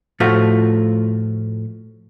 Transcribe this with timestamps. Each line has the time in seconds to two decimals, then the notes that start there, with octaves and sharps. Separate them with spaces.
0.20 A2 F3 A3 F4 F#4